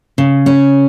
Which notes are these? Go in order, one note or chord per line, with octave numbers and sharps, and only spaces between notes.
C#3
C#4